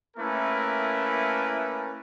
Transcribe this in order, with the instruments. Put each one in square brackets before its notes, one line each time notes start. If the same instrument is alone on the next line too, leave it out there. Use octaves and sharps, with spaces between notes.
[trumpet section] A3 A#3 C#4 E4 A#4 B4